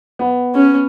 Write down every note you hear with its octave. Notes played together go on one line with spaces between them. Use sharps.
B3
C#4